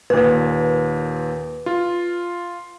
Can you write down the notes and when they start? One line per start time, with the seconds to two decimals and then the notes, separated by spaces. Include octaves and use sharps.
0.10 D#2 A#2 B4
1.66 F4